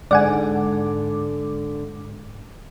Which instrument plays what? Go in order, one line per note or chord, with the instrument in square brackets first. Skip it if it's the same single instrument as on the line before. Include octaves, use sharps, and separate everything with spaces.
[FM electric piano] G#2 D6 [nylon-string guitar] D3 [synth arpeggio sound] D5 F#5 G#5